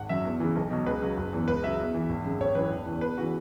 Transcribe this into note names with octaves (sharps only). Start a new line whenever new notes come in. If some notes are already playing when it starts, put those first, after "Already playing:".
Already playing: G#1 F#5
F#2 F#3 E5
E2
C#3 E3
B1
B2 F#3
C#2 B4
C#3 F#3
F#1
E2 E3
C#2 B4
C#3 F#3 E5
E2
E3
G#1
F#2 C#3
G#1 C#5
F#2 E3 B4
E1
E2 C#3 E3
E2 B4
C#3 E3 F#4